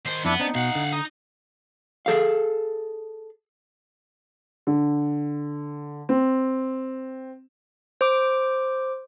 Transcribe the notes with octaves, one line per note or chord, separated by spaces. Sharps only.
D#3 C5
F2 B3 D4 E4
C4 D4 D#4
B2 F5 F#5
D3
D#4 D#6
G#4 A4 F5
D3
C4
C5 D6